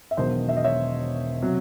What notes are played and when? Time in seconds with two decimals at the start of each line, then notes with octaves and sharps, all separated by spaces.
0.11 E5
0.17 E1 E2 D#3 F#3 C5 D#5
0.49 E5
0.57 D#5
0.64 C#5 E5
1.42 C3 F#3